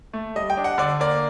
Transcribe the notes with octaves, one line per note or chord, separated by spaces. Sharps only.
A3
G3 D#5
G5
D4
F#5
D3 D5
A#3 D5